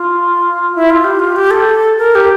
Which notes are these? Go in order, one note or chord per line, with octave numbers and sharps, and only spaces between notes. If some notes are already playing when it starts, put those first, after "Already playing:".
Already playing: F4
E4
F4
G4
F4
G4
A4
A#4
G4